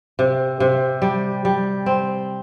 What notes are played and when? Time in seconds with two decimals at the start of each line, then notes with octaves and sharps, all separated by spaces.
0.19 C3
0.60 C3
1.02 G3
1.45 G3
1.86 C4